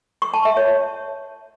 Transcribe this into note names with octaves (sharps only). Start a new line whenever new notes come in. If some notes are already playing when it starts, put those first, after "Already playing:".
C#6
A5
E5
C#5